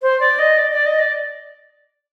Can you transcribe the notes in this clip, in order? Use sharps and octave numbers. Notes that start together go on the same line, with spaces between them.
C5
D5
D#5
D5
D5
D#5
D5